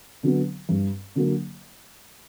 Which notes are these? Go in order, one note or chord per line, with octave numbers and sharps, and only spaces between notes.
D3 F#3 B3
G2
D3 F#3 A#3